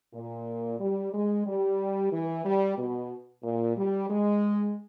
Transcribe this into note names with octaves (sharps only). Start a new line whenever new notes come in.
A#2
G3
G#3
G3
E3
G3
B2
A#2
G3
G#3